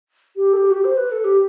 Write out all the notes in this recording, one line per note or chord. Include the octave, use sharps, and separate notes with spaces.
G4
A4
G4
F#4
G4
C5
B4
A4
G4